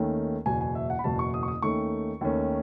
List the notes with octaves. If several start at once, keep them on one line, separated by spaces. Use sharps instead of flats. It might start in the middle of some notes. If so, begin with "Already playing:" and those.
Already playing: D#2 D#3 A3 C#4
F#1 E2 B2 G#5
G#5
E5
F#5
B5
F#1 E2 B2 A5
C#6
D#6
C#6
D#6
D#2 D#3 A3 C#4 C#6
D#2 D#3 A3 C#4